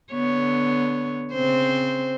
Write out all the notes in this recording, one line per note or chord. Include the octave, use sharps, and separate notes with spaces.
D3 B3 C#5
C#3 C4 C5